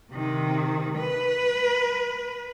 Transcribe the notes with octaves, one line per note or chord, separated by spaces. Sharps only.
C3 D#3
B4